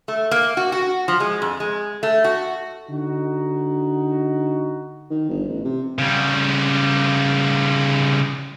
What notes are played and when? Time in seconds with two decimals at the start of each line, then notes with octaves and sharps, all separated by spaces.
0.08 A3
0.31 A#3
0.57 F#4
0.72 F#4
1.08 F3
1.20 G#3
1.42 F2
1.60 G#3
2.03 A3
2.24 F#4
2.90 D3 D#4 F#4
5.10 D#3
5.29 G1
5.48 A1
5.65 C3
5.99 C#3 G3